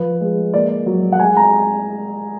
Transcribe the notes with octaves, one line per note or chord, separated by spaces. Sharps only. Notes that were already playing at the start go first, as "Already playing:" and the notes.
Already playing: F3 B4
G#3
A#3 D5
F#3
F#5
G#3 G#5
A#5